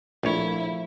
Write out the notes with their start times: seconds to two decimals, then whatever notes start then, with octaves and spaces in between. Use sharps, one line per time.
0.23 A#1 F3 A3 A#3 E4 C#5